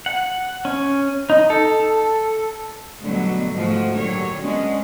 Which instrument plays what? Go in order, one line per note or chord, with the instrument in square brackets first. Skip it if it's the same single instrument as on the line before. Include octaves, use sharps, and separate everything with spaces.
[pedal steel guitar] F#5
C#4
D#4
A4
[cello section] B2 D3 F#3 G3 A3 B3
G#2 F3 A3 F4 F#4
A#2 D3 F#3 G4 C#5
G#3 B3 C#4 D4